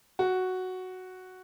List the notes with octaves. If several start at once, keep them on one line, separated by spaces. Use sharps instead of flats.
F#4